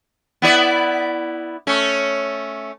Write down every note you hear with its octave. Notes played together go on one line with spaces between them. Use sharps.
B3 E4 D5
A3 C#4